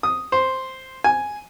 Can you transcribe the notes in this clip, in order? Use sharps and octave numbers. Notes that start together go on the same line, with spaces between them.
D#6
C5
G#5